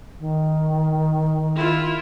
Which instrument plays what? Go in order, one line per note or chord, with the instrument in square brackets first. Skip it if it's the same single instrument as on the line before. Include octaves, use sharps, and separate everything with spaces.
[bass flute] D#3
[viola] E4 F4